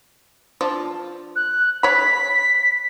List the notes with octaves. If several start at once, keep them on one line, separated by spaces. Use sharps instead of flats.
F3 D4
F#6
C#5 B5 B6